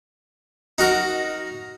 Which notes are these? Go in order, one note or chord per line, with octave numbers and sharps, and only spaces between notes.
D#4 F#4 A#4